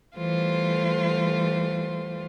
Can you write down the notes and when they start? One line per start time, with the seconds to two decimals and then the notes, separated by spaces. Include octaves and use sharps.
0.18 E3 G3 A3 F4 C5